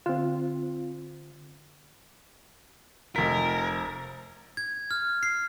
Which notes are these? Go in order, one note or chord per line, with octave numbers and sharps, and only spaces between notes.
D3 C4 F4
F1 A#4 B6
G#6
F6
C7